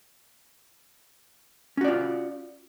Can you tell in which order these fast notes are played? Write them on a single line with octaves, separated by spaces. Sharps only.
C#4 F#4 D5 F4